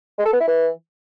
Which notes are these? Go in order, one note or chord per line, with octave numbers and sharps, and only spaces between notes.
G#3
A4
B3
E4
E3